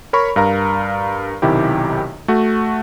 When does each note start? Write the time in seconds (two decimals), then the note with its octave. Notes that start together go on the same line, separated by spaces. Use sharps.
0.13 A#4 C#5 B5 C#6
0.36 G2 A#4 F5 A#5
1.42 B1 C3 D#3 E4 G4
2.28 A3 F#4